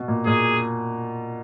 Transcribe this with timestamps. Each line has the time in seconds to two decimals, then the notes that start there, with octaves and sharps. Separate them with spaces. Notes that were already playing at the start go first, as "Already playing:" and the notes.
Already playing: B2
0.08 A#2
0.26 A#2 G#4